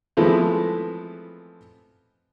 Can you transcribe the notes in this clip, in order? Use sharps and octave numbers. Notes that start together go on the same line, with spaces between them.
E3 F3 G#3 A3 B3 C4